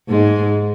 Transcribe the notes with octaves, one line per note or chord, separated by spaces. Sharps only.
G#2 G#3